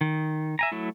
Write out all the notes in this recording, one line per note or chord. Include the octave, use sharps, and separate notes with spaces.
D#3
E5 G#5 A#5
F#3 A3 E4